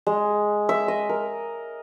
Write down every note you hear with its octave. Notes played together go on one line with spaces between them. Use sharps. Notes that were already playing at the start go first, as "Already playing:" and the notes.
G#3
E5
D#5
A#4